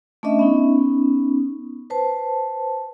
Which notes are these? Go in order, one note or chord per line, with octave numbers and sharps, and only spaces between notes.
A3 C#4 D4 D#5 E5
B3 C#4 D#4
B4 C5 A5